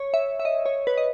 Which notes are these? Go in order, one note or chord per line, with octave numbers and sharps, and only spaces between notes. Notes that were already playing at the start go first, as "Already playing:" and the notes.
Already playing: C#5
E5
E5
D#5
C#5
B4
D#5